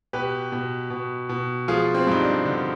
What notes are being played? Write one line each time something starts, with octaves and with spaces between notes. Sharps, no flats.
B2 G4 B4
B2
B2
B2
F3 F4 G#4
C4
G2 D#4
D4
D3